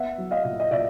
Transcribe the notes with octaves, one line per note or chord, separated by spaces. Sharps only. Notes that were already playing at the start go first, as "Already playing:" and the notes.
Already playing: B3 E5 F#5
F#3
D#5 F5
A#2
D#5
A#2 D5 E5